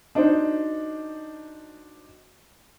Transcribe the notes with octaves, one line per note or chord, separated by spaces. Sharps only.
D4 D#4 F#4 C5